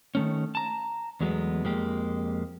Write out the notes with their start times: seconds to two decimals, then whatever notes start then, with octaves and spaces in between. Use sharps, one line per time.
0.15 D#3 A3 C#4
0.55 A5 A#5
1.21 E2 F#3 G#3 A3 B3
1.64 F2 G#3 A#3 G4